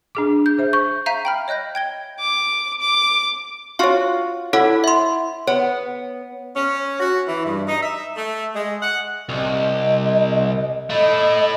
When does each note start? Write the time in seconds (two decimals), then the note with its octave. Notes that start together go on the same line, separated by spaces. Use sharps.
0.15 D4 G#4 D6
0.46 G6
0.58 G#4 C5 E5
0.73 C#6 G6
1.06 E5 F5 A#5 G6 B6 D#7
1.25 G5 B5 F6
1.48 C#5 D#5 F#6 G6 A#6
1.75 G5 G#6 G7
2.19 D6
2.81 D6
3.79 F4 F#4 C#5 F5
4.53 E4 A4 C#5 F#5
4.84 E5 C6
5.47 B3 C#5
6.56 C#4
7.00 F#4
7.28 E3
7.46 G2
7.68 D#4
7.82 E5
8.17 A3
8.56 G#3
8.82 F#5
9.29 C2 D#5
10.90 A3 E4 D#5